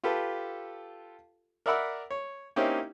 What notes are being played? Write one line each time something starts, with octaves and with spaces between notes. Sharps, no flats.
F4 G4 A4 B4
A#4 D5 E5 F#5 B5 E6
C#5
A#3 C4 C#4 D#4 E4 G4